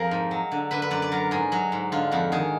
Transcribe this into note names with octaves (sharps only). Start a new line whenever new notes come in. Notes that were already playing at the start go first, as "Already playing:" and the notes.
Already playing: F2 F3 G#4 A#4
G#2
F#3
D3
D3 B4
B4
F#2 D5
D5
F#3 A#4
G#2 G#4
F#3
G#2
D3 F4
F2 F#4
D#3 G#4